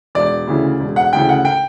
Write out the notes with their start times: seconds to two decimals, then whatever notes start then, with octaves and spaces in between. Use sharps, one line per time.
0.15 E1 D5
0.47 D2 C#3 E3
0.80 E1
0.96 F#5
1.13 D2 C#3 E3 G5
1.29 F#5
1.45 G5